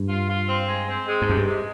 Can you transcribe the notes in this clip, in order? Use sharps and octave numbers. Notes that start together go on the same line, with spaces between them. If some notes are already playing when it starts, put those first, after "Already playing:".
Already playing: G2
F4
F4
C4
G#3
C4
G#3
G#2
F#2 C3
G2
G#3